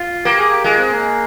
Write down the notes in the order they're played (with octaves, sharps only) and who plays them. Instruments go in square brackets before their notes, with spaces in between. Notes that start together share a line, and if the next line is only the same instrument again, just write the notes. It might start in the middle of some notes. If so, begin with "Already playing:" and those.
Already playing: [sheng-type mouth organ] F4
[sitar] A#3 [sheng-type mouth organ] G4
[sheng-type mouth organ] G#4
G4
[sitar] G#3 [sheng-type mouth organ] F4
[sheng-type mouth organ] C4
A#3